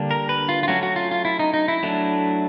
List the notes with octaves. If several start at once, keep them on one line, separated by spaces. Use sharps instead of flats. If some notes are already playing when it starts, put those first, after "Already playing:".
Already playing: D3 G3 A#3 D4
A#4
B4
F4
F4
F#3 A3 C#4 F#4
F#4
F4
F4
E4
D#4
D#4
E4
F#3 A3 D4